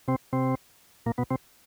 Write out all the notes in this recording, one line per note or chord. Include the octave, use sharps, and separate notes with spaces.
C3 C4
C3 C4
A#2 A#3
B2 B3
C3 C4